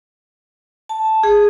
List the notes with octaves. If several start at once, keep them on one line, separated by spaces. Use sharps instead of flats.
A5
G#4